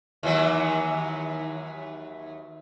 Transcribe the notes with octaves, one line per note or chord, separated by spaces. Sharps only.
D#2 E3 F#3